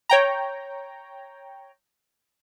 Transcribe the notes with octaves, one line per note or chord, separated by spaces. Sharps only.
C#5 G5 A#5